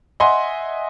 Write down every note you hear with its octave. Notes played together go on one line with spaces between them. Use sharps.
D#5 E5 F#5 G#5 C6